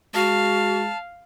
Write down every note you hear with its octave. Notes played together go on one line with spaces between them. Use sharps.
G#3 F#4 F5 A5